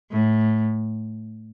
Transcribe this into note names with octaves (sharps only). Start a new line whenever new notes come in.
A2